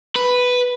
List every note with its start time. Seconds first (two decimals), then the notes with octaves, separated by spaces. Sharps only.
0.15 B4